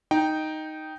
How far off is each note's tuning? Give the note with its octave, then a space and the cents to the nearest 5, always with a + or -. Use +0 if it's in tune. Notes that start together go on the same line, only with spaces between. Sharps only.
D#4 +0 G5 +0